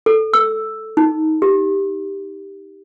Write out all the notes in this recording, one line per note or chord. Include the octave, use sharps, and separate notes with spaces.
A4
E6
D#4
G4